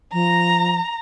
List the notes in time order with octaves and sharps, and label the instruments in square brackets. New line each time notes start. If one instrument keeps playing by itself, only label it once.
[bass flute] F3 [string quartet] A#5